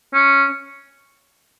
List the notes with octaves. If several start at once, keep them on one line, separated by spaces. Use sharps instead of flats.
C#4